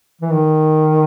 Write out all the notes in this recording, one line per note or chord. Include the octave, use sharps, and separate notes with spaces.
E3
D#3